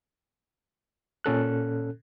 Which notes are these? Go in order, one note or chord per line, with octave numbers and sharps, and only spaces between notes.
A#2 C#4 A4 F#6